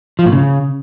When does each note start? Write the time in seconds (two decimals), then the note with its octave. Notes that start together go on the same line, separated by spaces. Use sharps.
0.19 F3
0.26 A2
0.32 C#3